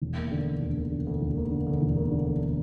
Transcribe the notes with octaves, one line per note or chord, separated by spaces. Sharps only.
E1
A#3
D3
D2
E1
A#3
D3
D2
E1
A#3
D3
D2
E1
A#3
D3
D2